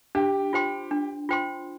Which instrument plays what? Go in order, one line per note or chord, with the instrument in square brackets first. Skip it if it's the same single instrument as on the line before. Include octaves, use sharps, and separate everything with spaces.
[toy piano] D4 [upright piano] G4
[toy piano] F4 C5 G5 C6
D4
F4 C5 G5 C6